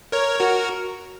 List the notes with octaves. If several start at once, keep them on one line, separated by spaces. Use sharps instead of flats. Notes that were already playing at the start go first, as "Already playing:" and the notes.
A#4 C#5
F#4 A#4